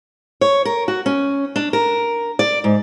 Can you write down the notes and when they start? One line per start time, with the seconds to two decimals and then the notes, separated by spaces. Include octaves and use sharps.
0.41 C#5
0.65 A#4
0.88 F#4
1.06 C#4
1.56 D4
1.73 A#4
2.39 D5
2.64 G#2